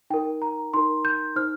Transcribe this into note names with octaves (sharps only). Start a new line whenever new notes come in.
D#4 A#4 G5
A#5
D#4 A#4 C6
G6
D#4 C5 F6